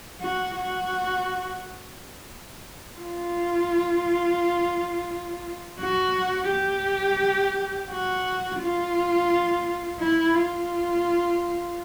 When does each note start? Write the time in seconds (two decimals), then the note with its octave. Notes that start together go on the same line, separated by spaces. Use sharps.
0.21 F#4
0.55 F#4
3.00 F4
5.80 F#4
6.49 G4
7.89 F#4
8.60 F4
9.99 E4
10.34 F4